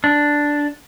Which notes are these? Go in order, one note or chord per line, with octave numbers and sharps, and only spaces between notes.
D4